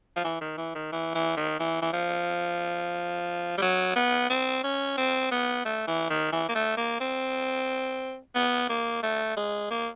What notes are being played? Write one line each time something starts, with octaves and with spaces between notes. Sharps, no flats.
F3
E3
D#3
E3
D#3
E3
E3
D#3
E3
E3
F3
G3
F#3
B3
C4
C#4
C4
B3
A3
E3
D#3
E3
A#3
A3
A#3
C4
B3
A#3
A3
G#3
A#3